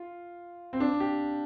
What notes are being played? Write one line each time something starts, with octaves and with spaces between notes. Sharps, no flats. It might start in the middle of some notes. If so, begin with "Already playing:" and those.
Already playing: F4
C4
D4
G4